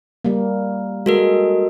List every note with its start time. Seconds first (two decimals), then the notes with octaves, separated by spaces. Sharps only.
0.25 G3 A#3
1.06 G#3 F#4 A4 A#4